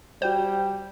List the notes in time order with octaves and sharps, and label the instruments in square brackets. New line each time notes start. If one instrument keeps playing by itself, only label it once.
[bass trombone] G3 [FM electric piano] F#4 G5 G6 [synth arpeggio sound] C5